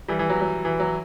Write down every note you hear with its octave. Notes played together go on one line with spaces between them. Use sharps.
E3 G3
E3
F#3
F#3
E3
F#3